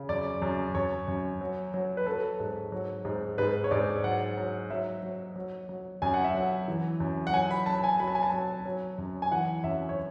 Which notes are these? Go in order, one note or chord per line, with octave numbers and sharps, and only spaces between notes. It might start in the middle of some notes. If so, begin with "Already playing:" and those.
Already playing: C#3
F#2 D5
F#2
F#2 C#5
F#2
F#3
F#3
B4
F#3 A4
G#2
F#3
G#2
G#2 B4
C#5
G#2 D5
F#3 F#5
F#3
F#3 E5
F#3
F#3
F#3
F#2 G#5
F#5
E5
F#3 F#5
E3
F#2
F#5
F#3 G#5
B5
F#3 A5
G#5
F#3 B5
A5
G#5
A5
F#3
F#3
F#2
G#5
E3 F#5
F#2 E5
C#5